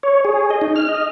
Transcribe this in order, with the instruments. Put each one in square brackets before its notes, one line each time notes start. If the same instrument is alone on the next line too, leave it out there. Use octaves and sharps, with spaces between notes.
[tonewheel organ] C#5
G#4
D#5
D#4
F6
D#5